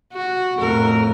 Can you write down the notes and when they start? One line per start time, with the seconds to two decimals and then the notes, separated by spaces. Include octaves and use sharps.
0.12 F#4
0.58 F2 A2 A#4